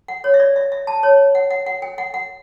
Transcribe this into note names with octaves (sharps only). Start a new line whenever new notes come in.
F#5
C#5
E5
D5
E5
E5
A5
C#5
F#5
F#5
F#5
G5
F#5
F#5